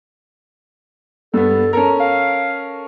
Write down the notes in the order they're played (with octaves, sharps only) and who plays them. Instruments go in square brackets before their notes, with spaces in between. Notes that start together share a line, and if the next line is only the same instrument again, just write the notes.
[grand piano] G2 B3 [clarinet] A4
[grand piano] C#4 A4 A#4 [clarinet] A#5
[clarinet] F5